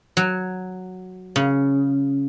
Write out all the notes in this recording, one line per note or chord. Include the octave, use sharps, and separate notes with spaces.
F#3
C#3